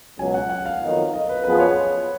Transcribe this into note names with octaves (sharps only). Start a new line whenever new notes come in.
C#2 B2 F#3 G#5
F#5
F#5
F5
F2 D#3 F#3 B3 D#4
D#5
B4
F#2 F3 B3 F4 G#4 B4
C#5